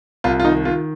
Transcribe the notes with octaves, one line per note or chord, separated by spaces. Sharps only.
C2 F4
F4
D#3 D#4
D#3 F4